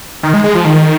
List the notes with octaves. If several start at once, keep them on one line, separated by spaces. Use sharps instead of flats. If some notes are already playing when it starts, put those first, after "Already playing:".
D#3
G#3
G#3
F3
D#3